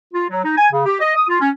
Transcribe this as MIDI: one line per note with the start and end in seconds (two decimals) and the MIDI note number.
0.13 0.24 65
0.29 0.43 54
0.43 0.53 63
0.57 0.66 80
0.72 0.84 49
0.85 0.98 67
1.00 1.14 75
1.16 1.24 87
1.29 1.39 65
1.40 1.49 61